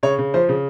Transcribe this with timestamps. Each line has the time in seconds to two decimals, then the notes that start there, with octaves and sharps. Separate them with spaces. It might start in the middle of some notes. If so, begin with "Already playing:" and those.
0.03 C#3 C#5
0.18 C#3
0.34 F3 C5
0.49 C#3